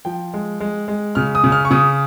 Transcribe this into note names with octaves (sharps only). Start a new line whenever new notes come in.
F3 G5
G#3
G#3
G#3
C#3 F6
D#6
C#3
F6
C#6
C#3 D#6